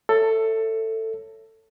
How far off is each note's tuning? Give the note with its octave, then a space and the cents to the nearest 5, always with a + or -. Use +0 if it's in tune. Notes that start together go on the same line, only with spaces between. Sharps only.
A4 +15 C#5 +0 E5 +0